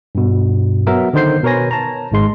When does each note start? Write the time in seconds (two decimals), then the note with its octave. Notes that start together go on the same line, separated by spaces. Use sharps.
0.15 G2 B2
0.87 F#3 B3 A#4 E5
1.13 D3 D#3 D#4 C5 G6 C7
1.43 B2 A#4 B4 C#5 G#5 A#6
1.71 A5 A#5
2.12 G#1 G#2 G#3 C6